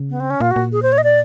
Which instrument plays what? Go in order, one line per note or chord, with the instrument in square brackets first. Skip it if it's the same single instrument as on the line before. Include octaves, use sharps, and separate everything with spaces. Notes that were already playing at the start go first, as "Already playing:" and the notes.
Already playing: [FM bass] C#3
[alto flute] B3
C4
C#4
[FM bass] A#2 [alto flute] F4
[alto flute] F#4
[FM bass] A#2
[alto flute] G#4
C5
C#5
D#5
D5